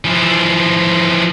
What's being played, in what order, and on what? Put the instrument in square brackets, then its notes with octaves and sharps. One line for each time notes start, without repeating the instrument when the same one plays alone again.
[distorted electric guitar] E3 F3